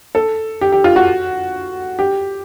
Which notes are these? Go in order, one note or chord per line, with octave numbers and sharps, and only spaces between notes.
A4
G4
G4
F4
F#4
G4